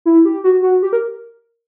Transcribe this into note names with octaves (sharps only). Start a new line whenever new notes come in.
E4
G4
F#4
F#4
G4
A#4